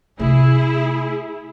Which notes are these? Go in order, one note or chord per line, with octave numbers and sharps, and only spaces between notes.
C3 A3 E4 G#4